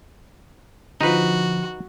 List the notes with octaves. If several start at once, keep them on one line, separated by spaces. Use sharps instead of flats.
D3 F3 D#4 F#4 B4